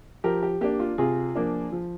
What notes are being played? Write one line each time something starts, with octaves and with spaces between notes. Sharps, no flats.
F3 G4 A#4
G4
A#3 D4 G4
F4
C3 F4 G#4
F3 A#3 D4
F3